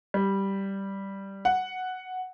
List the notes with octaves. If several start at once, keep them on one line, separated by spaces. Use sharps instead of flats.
G3
F#5